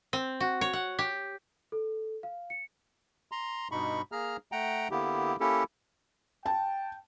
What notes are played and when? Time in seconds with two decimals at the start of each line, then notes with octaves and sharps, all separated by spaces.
0.13 C4
0.40 F#4
0.61 C#5
0.73 F#5
0.99 G4
1.72 A4
2.23 F5
2.50 C#7
3.32 A#5 C6
3.71 G2 B2 D#4 B5 C#6
4.12 A#3 G#4 A#5 F6
4.52 A3 F#5 G5 A#5
4.91 D3 A#3 B3 E4 G4
5.40 A#3 C#4 E4 G4 A4
6.46 G5 A5